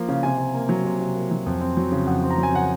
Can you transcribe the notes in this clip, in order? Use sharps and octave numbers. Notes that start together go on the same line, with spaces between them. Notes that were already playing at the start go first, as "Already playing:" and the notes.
Already playing: F3 A#3
C#3 F5
C3 G#5
C3
A#3
F#3
C3
C3
A#3
F#3
F2
C4
F#3
C#3
F2 F#5
C4
A#5
F#3
G#5
C#3 F#5